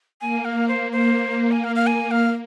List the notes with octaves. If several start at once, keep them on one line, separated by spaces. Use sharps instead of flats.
A#3 G#5
F5
C5
A#3 C5
G#5
F5
F5
G#5
F5